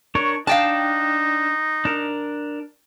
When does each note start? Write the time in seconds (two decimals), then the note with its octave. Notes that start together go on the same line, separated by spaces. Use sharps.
0.15 D4 A#4 C#5 C#6
0.47 D4 D#4 F5 G5 A5
1.85 D4 A#4